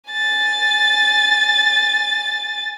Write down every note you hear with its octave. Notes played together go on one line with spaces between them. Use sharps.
G#5 A6